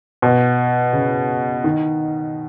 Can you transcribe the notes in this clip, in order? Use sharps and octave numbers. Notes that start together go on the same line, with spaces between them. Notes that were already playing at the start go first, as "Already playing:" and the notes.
B2
C#3
D#3